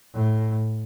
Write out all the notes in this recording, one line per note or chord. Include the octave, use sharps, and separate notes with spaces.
A2